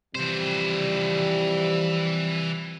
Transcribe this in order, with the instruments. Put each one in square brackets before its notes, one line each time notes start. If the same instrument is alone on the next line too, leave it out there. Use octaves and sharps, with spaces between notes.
[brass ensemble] C3 F3 G3 [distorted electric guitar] E3 C5